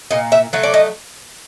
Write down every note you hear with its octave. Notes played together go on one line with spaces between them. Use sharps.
A#2 D#5
E5
F#3 A3
D5
D#5